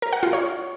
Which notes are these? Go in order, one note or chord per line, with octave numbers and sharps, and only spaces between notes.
A#4
F#5
F4
C#5